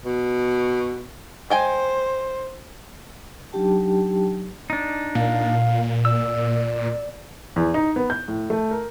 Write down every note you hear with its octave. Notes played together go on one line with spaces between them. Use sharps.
B2
G#3 C5 G5 G#5
F#3 D4 D#4 G4 G5 A5
D4 D#4
A#2 F5
D5 E6
E2
D#4
B3
G6
A2
A3
A#4